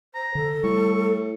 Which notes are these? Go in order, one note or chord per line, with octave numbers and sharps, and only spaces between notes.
C5 A#5
D3 A4
A2 G3 C#6